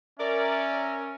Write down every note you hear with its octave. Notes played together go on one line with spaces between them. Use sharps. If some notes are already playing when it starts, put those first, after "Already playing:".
C#4 A#4 D5 E5